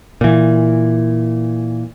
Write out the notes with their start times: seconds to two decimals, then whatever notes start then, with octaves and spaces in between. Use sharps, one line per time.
0.21 A#2 E3